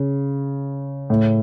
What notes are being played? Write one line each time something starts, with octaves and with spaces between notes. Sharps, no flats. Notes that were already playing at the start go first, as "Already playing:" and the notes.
Already playing: C#3
A2